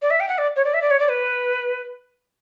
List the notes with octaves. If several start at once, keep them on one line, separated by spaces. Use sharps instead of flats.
D5
E5
G5
F#5
D5
C#5
D5
E5
D5
C#5
D5
B4